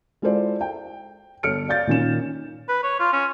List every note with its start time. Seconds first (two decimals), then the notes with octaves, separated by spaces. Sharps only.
0.22 G#3 E4 F4 A4 C5 D5
0.61 G5
1.43 G1 A4 C#5 F6 C#7 D7
1.68 D5 F5 G6 A6
1.87 A#2 D#3 C#4 E7
2.68 B4
2.84 C#5
3.00 F4
3.12 C#4